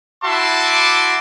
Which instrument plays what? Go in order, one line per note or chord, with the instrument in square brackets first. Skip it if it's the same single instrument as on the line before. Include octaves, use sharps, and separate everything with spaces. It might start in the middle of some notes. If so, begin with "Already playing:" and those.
[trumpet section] E4 F#4 E5 A5 C6 D6